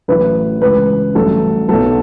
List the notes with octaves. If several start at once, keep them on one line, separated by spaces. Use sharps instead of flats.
A1 A2 F#3 B4
C#2 C#3 E3 B4
A1 G2 F#3 A4
B1 B2 F#3 A4